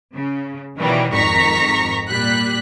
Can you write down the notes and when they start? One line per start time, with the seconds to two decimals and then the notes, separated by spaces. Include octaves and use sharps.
0.14 C#3
0.77 B2 D#3 E3 F#3 G3
1.12 G#1 F2 D#3 A#5 C#6 B6
2.07 A#2 G3 F#6 B6